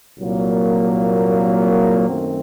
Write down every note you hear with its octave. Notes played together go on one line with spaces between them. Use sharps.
C2 A#2 F#3 A#3
F#2 D#3 A3 C4